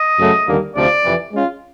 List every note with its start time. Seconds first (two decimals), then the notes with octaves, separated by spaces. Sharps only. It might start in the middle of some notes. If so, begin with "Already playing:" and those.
Already playing: D#5
0.19 F#2 C#3 F#3 A3
0.48 D#2 D3 G3 A#3
0.76 D2 C3 F3 D5
1.04 F2 C3 E3
1.32 G#3 C#4 F4